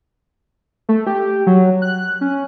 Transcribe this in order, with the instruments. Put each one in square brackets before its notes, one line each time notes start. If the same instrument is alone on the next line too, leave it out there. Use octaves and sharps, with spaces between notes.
[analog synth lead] A3
G4
F#3
F#6
C#4